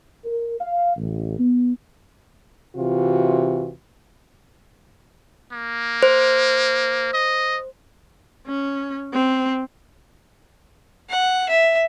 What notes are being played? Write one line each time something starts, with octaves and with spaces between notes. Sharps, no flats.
A#4
F5
A1
B3
C3 E3 F4 F#4
A#3
C5
D#5
C#4
C4
F#5
E5